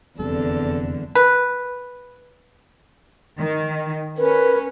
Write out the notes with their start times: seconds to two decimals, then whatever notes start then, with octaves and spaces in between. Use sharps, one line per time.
0.19 F1 E2 D3 G3 C4 A4
1.15 B4
3.38 D#3
4.17 C#4 A#4 B4